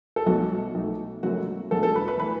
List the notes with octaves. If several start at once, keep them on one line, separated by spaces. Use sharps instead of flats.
A4
B1 B2 F#3 A3 F#4
B1 B2 A3
F#1 F#2 F#3 A3 F#4
E1 E2 D3 F#3 A3 A4
A4
B4
B4
E3 A3 B4